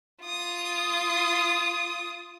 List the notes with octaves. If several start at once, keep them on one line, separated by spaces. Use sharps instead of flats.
F4 D#6